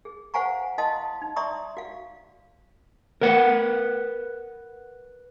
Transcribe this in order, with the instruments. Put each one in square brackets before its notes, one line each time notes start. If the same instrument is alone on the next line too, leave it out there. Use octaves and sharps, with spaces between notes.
[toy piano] G#4
C5 F5 F#5 G#5 A#5 C#6
E4 D#5 F5 A5 C6 D#6
D#4
D5 E5 A#5 C6 C#6 D#6
F#4 F5
[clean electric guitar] A#4 B4 F#5